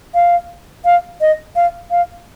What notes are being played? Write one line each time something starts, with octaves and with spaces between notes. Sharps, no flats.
F5
F5
D#5
F5
F5